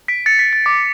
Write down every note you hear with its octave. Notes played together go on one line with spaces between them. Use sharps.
B6 D7
A6 C#7
B6
A6
D6